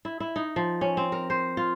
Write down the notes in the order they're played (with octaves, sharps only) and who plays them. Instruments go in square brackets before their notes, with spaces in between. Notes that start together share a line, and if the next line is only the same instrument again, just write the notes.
[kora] E4
E4
D#4
F3
C#4
C4
A#4
C5
F4